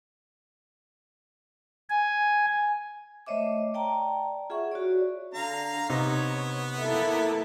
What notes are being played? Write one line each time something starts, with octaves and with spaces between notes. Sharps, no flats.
G#5
A3 C5 C#5 D#5 E5 D6
D5 G5 A5 A#5
F4 G#4 E5 F#5 C#6
F#4 C#5 D5
D3 F5 A#5
C3 B3 D#4 C#5
A#3 E4 A4 E5